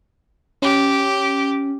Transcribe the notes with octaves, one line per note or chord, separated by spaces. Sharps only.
C#4 G4